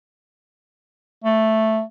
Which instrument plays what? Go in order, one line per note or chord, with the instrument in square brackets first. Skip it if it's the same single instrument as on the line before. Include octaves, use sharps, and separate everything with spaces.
[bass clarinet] A3